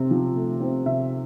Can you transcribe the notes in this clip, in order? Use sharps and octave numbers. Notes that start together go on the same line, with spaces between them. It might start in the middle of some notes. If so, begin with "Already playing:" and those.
Already playing: C3 C4
F3
A3
C4
C3 E5